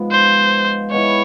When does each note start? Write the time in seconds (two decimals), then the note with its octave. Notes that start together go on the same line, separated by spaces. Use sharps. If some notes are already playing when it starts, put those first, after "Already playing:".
Already playing: G#2 F3 G#3 B3
0.11 C5
0.91 G#3 B3 E4 C#5